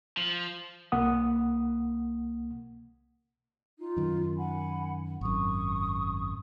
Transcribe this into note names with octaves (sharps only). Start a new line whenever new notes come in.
F3
C2 A#3 F#5 D#6
D#4 F4
F#2 D#3
F#5 G#5 B5
G#1 F#2 C#6 D#6